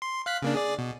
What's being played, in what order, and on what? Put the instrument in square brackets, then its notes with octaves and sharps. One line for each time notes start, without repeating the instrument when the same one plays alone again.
[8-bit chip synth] C6
F5 F#6 B6
C#3 A#3 D4
G#4 D5
B2